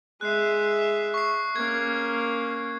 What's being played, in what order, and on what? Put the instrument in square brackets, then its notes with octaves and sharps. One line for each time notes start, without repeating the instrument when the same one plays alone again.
[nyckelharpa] G#3 E5 [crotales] F#6 C7
[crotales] C#6 C7
[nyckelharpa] A#3 C#4 [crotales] G#6